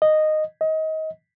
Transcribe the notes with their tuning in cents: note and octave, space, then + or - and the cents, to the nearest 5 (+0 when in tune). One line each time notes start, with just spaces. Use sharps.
D#5 -10
D#5 +25